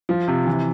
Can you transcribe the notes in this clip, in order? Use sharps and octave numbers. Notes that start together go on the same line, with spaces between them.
F3
C3
E3